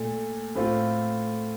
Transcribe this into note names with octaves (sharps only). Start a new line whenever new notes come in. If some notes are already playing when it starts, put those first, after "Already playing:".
Already playing: A#2 A3
A2 A3 C4 F4